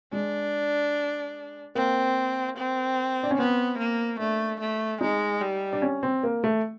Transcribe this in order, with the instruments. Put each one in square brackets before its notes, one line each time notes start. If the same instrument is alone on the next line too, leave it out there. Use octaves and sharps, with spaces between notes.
[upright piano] G#3 [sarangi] D4
[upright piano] A#3 [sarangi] C4
[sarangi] C4
[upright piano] D4
C#4
[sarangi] B3 [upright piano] C4
[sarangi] A#3
[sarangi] A3 [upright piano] D4
[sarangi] A3
[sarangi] G#3 [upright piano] D#4
[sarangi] G3
[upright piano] D4
C#4
C4
A#3
A3